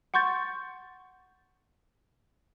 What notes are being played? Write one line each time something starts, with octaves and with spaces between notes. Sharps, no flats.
F#5 C6 C#6 G6 A6